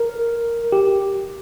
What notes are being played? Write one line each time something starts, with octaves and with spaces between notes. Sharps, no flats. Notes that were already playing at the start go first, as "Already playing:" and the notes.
Already playing: A#4
G4